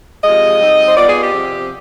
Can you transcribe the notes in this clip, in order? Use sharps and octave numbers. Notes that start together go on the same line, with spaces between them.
C3 F3 G#3 D#5
G3 C4 D#4
C5
G3 B3 F4 D5
G#4
G4
C3 F3 C4